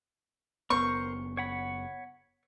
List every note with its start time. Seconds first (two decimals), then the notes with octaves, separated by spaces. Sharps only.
0.70 F#1 E2 B3 A#4 C5 C#6
1.37 C#5 F#5 B5